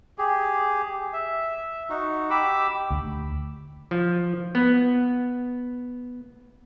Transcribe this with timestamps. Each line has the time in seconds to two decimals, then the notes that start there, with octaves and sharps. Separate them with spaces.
0.18 G4 G#4
1.13 E5
1.90 D#4 F#4
2.30 G4 B5 D6 E6
2.90 D2
3.91 F3
4.55 B3